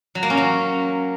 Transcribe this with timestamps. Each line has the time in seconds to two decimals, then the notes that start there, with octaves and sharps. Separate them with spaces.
0.15 F#3
0.23 A#3
0.30 C#4
0.37 F#3